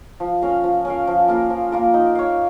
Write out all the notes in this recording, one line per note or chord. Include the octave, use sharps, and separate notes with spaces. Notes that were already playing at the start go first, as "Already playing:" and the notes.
F3
C#4 A#4 F5
F3
C#4 A#4 F5
F3
A#3 F4 A#4
F3
A#3 F4 A#4
D#4
C#5 F5